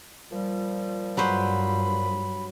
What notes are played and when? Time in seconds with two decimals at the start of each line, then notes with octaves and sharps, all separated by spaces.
0.31 A#2 F3 G3
1.17 G2 F#3 B4 C5 B5